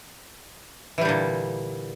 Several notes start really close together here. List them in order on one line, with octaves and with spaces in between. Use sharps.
E3 G3 D3 A#2